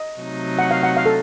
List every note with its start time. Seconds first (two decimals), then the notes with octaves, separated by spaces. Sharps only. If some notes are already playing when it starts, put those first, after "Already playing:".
Already playing: D#5
0.21 C3 F#3 A3 D#4
0.59 F#5
0.71 F5
0.83 F#5
0.97 F5
1.06 A4